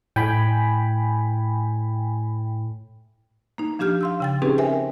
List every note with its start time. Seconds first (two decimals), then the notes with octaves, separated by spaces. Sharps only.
0.16 A2 G5 G#5 B5
3.58 A#3 D#4
3.79 F3 D4 G4 F6 G6
4.01 F5 C6 E6
4.20 C#3 G5 A6
4.42 C4 C#4 D#4 G4 G#4 B4
4.58 A#4 C5 E5 G5 G#5